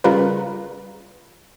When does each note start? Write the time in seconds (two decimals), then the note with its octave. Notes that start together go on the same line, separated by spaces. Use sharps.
0.04 C#3 G3 F4 A#4 B4